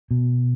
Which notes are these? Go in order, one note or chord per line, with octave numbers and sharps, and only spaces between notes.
B2